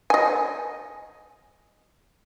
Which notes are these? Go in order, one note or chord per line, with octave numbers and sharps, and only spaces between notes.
D#5 G#5